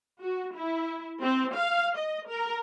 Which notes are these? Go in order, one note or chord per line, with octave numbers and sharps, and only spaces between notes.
F#4
E4
C4
F5
D#5
A#4